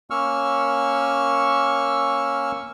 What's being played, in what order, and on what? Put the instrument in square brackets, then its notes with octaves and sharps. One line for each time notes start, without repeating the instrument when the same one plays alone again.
[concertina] A#3 C#4 C#6 E6 F6